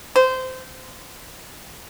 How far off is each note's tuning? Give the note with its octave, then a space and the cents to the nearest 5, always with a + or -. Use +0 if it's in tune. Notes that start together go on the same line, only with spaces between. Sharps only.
C5 -20